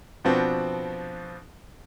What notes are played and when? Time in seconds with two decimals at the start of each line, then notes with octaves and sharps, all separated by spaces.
0.24 B2 F3 B3 C4 D4 F#4